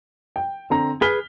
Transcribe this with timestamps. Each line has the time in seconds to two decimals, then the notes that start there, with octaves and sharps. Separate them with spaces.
0.36 G5
0.70 D3 C4 A#5
1.02 G#4 B4 F6 B6 G7